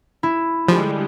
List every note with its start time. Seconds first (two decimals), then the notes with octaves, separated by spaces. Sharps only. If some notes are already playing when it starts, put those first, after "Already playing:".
0.23 E4
0.68 D3 F3 G3 G#3